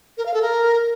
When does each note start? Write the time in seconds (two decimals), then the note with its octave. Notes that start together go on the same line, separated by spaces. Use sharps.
0.18 A#4
0.26 F5
0.34 A4
0.42 A#4